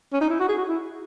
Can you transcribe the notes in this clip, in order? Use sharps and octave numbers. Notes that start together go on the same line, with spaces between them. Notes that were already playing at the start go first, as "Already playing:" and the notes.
C#4
D#4
E4
F#4
G#4
F#4
E4